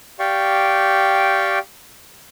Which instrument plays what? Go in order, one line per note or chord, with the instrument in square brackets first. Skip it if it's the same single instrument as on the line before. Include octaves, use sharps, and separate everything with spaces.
[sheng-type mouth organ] G4 D5 F5 G5 C#6